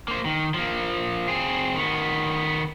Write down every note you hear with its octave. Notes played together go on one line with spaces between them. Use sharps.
A#3 C5
D#3
F3 A#3
C4 G#4
D#3 B3